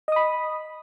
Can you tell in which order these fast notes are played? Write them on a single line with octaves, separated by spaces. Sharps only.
D#5 D#6 B5